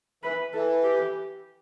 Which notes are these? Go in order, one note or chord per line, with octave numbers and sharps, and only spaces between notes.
E3 B4
E3 A4
G4